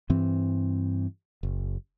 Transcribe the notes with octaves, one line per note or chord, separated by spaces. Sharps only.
G2 E3 C4
F#1